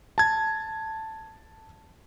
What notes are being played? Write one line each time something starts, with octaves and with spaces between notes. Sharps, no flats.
A5 G#6